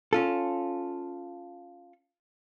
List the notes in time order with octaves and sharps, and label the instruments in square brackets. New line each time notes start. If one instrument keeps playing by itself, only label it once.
[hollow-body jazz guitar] C#4 F4 A4